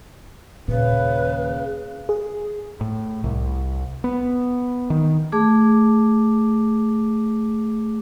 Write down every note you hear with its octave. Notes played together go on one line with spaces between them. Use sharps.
D#2 A#2 C#3 B4
G#4
A2
C2
B3
D#3
A3 G#4 D6